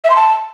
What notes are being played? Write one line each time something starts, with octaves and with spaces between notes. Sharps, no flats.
E5
C6
A5